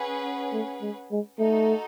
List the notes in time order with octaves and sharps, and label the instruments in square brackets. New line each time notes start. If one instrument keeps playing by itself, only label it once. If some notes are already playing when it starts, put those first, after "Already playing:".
Already playing: [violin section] C#4 G#4 B4 F#5
[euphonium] A3
G#3
G#3
[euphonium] A3 [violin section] D#4 F#4 A4